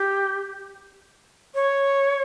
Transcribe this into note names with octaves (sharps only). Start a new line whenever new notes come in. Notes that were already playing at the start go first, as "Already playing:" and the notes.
Already playing: G4
C#5